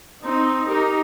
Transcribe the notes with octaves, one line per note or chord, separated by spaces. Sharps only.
C4 D#4
D#4 G4 A#4